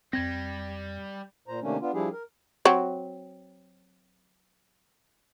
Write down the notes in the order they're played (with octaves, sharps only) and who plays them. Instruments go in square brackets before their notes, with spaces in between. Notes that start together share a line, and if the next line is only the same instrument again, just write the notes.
[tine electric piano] F2 G#6 A#6 [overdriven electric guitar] G3 [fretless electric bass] C4
[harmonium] A#2 C5 A#5
C3 D#3 A3 A#3 C#4 D4
B3 D4 F4
F3 G3 D4 E4 G4 G#4
A#4
[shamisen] F#3 C4